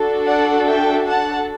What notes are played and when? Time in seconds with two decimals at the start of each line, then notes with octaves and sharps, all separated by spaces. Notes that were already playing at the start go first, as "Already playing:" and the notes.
Already playing: D4 F#4 A4
0.26 D5 F#5
0.66 E5 G5
1.07 F#5 A5